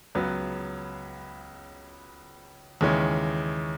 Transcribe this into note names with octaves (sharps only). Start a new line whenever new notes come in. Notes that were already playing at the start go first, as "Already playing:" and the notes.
C#2 C#3 F#3 B3
D#2 C#3 E3 G#3 C#4